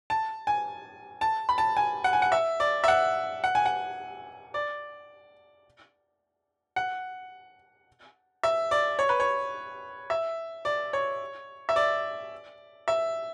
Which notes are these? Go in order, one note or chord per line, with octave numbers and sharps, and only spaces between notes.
A5
G#5
A5
B5
A5
G#5
F#5
G#5
F#5
E5
D5
E5
F#5
F#5
G#5
F#5
D5
F#5
E5
D5
C#5
B4
C#5
E5
D5
C#5
E5
D5
E5